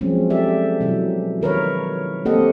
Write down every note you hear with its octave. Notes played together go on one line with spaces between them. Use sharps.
F3 F#3 G#3 C4 C#4
G4 A4 D5 E5
B2 E3 F#3
D#3 A#4 B4 C#5
A#3 C4 G4 A4 D#5 F#5